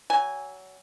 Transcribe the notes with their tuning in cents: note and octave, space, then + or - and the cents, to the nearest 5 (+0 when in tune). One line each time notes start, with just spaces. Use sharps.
F#3 +25 G#5 -5